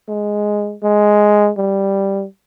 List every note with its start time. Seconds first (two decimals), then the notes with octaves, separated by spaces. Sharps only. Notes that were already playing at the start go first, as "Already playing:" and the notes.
0.08 G#3
0.83 G#3
1.57 G3